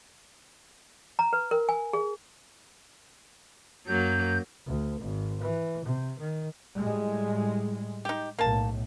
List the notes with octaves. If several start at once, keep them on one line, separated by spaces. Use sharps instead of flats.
A#5
B4
A#4
G#5
G#4
F#2 F#3 A#3 G6
D2
G#1
E3
C3
D#3
A2 G3 G#3
D#4 G4
B1 A2 A#3 A5